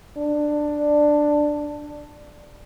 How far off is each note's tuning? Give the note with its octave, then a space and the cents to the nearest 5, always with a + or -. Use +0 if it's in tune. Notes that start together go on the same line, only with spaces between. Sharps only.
D4 +10